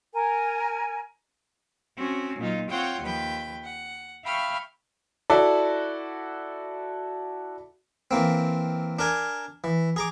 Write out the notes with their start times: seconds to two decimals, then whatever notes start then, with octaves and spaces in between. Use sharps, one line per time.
0.13 A#4 G#5
1.96 C4 C#4 F#4
2.39 A#2 F#3 D#4 F4
2.69 C4 F4 C#5 F#5 G5 C6
3.01 D#2 F3 B4 G5
3.64 F#5
4.25 E5 F5 G5 B5 C#6 F6
5.30 E4 F#4 A4 D5
8.11 E3 A#3 C4
8.99 D4 A#4 G#5
9.64 E3
9.96 G#4 A#5 D6